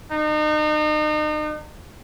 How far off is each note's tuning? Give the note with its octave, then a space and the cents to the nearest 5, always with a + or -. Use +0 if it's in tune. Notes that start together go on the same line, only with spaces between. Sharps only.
D#4 -35